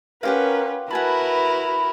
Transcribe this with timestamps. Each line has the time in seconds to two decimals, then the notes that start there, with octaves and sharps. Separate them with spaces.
0.23 C#4 F4 G4 A#4 B4 F#5
0.91 E4 F#4 A#4 B4 F#5 G#5 A5 B5